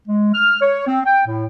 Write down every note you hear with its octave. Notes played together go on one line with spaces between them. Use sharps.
G#3
F6
C#5
C4
G5
A2